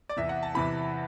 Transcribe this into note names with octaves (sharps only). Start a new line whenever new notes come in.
D5
E2 C3 E3 E5
F#5
A5
E2 C3 E3 B5